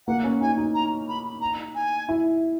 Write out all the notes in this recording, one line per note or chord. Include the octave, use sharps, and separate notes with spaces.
A#3 F#5
C#4
D#4 G#5
D#4
A#5
B5
A#5
G#5
E4